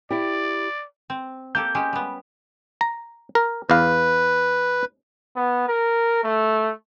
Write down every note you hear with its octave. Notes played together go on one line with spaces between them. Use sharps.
E4 G4 D5
C4
A#3 G4 A4 G6
G#3 C#4 G4
G3 B3
A#5
A#4
E2 B4 F5
B3
A#4
A3